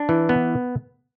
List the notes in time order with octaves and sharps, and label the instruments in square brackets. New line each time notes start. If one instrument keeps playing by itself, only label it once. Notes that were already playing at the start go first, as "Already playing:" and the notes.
Already playing: [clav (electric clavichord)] D4
E3
B3